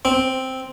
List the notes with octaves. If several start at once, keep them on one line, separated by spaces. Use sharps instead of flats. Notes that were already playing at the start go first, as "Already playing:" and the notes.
C4